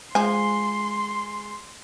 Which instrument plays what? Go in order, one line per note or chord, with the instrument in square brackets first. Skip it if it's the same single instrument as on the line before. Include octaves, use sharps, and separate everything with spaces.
[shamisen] F3 G#5 [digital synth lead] G#3 [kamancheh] C6